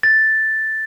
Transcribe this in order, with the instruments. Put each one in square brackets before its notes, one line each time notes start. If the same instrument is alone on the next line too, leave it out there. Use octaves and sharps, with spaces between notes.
[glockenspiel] A6